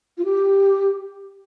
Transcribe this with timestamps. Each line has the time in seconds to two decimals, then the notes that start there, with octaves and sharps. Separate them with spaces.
0.18 F4
0.25 G4